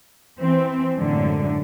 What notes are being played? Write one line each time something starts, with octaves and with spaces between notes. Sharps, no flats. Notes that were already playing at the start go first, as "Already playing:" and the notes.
E3 C4
F#2 A2 D3 G#3